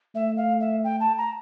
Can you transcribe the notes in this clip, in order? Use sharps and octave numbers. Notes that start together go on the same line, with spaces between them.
A3 E5
F5
E5
G5
A5
A#5